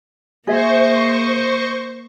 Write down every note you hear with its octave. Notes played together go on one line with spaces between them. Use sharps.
A#3 G#4 C5 D#5 E5 C#6